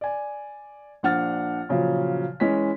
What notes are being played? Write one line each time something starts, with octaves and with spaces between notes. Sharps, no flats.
D5 G#5
A#1 D4 F#5 F6 A6
A#2 C#3 F3 F#3
E3 G#3 C#4 B6